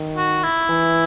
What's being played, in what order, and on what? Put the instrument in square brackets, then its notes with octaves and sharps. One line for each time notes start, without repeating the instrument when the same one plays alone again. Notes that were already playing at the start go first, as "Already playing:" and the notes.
Already playing: [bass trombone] D#3
[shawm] F#4
E4
[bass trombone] E3